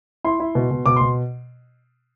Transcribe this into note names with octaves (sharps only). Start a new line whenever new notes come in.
E4 C6
E4
B2
B2
B2 D6
B2 C6